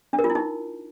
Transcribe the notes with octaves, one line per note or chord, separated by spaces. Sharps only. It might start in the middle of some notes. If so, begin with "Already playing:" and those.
D4
A#4
F4
E4
D#4